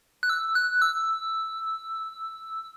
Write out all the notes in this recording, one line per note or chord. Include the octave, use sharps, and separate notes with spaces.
F#6
E6
F#6
E6